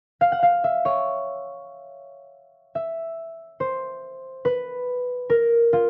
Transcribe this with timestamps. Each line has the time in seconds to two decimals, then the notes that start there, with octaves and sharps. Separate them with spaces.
0.21 F5
0.32 F#5
0.43 F5
0.64 E5
0.85 C#5
2.75 E5
3.60 C5
4.45 B4
5.30 A#4
5.73 F4